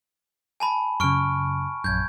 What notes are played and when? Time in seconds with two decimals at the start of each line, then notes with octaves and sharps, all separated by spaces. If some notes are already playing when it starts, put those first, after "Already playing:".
0.60 G#5 A5 B5
1.00 F#2 C#3 C#6 F6 D7
1.84 A#1 F#2 G6 G#6